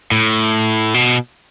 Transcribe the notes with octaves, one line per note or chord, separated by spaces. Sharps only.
A2
B2